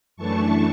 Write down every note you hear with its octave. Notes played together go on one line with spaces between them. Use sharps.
F#2 E3 A3 D4 A5 C#6